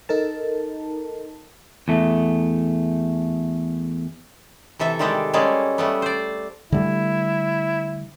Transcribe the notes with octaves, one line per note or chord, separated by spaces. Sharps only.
D#4 A4 A#4 A5
E2 A3
C3 E3 A4 E5
D#3 G3 G#3 G4 A4
G3 G#3 A#3 C#4 G#4 A4
G3 A3 B3
C5 D5
D3 G3 A3 E4